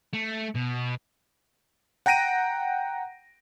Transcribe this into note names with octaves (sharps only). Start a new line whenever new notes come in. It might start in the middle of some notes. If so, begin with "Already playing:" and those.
A3
B2
F#5 G5 A#5 A#6 D7 D#7